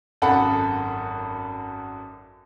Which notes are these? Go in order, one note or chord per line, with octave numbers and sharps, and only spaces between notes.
G#1 F#2 A4 F#5 B5